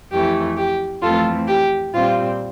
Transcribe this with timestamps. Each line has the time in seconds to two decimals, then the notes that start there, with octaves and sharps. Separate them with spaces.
0.11 F2 E3 A3 G4
0.57 G4
1.02 F2 E3 A3 C4 F4 A4
1.47 G4
1.93 A#2 G3 C4 F4